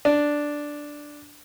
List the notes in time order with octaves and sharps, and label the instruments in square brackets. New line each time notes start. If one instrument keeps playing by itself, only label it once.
[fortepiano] D4